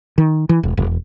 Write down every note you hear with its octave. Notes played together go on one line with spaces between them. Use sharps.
D#3
E3
E1
E1